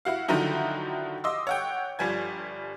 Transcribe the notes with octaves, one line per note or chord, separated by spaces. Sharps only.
E4 F#4 F5
D3 D#3 F3 F#3 D#4 E4
D#5 C6 D6 E6
C#5 F#5 G5
G1 F3 G3 G#5 G#6